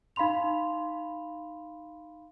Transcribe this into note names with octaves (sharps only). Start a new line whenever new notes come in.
D#4 F5 B5 C6 F7